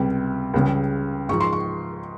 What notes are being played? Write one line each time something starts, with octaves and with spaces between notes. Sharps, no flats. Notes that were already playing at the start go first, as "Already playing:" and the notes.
Already playing: C#2 C3 G3
C#2 C#3 G3
G#2 F3 C#6
C6
C#6